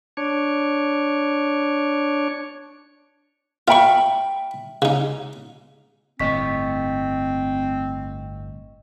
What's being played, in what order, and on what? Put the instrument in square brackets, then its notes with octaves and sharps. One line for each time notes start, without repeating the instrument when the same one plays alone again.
[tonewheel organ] D4 C#5
[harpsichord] F4 C#6 [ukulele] E5 G5 B5
[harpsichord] C#3 D#4
[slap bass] G1 A2 A3 [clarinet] C4 [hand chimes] D#5 C#6 B6